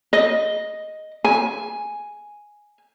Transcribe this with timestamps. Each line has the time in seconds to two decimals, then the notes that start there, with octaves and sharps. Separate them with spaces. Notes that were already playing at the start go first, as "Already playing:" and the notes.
0.13 D#5
1.24 G#5